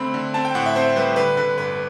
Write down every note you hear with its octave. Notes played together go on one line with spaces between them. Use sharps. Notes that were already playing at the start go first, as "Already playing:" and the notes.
Already playing: D3 A3 C4 B5
D3
C4 A5
G5
A2 F#5
E5
C4 C5
G3 B4
D3 B4
D3 B4
G1 B4